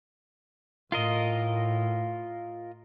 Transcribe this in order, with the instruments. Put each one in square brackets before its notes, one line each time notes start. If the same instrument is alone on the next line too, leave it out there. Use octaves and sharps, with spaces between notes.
[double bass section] A2 [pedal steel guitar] F4 A#4 D#5